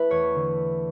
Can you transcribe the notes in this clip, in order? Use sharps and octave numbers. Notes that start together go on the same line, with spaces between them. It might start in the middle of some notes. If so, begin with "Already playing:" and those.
Already playing: A3 E4 B4
E2 C#5
D3